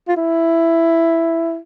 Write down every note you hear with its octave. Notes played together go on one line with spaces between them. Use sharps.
F4
E4